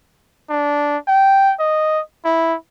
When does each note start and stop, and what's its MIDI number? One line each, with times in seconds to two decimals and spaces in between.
0.50 0.97 62
1.08 1.54 79
1.60 2.01 75
2.25 2.55 64